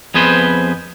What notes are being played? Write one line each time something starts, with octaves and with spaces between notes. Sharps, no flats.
F2 B3 G#4 B4 C5